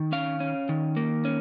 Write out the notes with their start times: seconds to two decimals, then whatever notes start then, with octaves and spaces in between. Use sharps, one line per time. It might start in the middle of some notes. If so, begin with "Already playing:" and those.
Already playing: D#3
0.12 C#4 F5
0.40 C#4
0.69 D#3
0.97 A#3
1.25 C#4